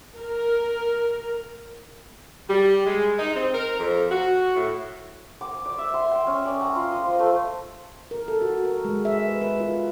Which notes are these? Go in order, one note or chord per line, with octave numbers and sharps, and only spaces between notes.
A#4
G3
G#3
D#4
C4
A#4
F2
F#4
A2
D6
D5
E5
C6
G5
C#4
D5
A#5
F4
D#5
C5
A3
A#4
A4
F#4
A#4
G#3
E5
B4
B4
F4